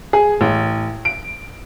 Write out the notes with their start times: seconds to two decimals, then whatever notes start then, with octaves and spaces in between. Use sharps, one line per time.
0.13 G#4
0.41 A1
1.05 D7